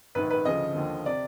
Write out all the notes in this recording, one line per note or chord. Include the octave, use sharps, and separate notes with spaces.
A#1 G#2 D#3 B4
B4
D2 C#3 F3 D#5
D#2 D3 F3
C3 D5